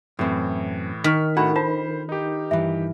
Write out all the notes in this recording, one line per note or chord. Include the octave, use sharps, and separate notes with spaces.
F#2 A2 E3 C4
D#3 C#6 F6 B6
A2 D4 F#4 A4 F#5 B5
F4 C5 A5
D#4 G4
G2 E3 E5